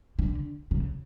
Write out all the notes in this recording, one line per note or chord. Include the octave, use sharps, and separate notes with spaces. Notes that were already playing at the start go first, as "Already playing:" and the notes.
D3
C#3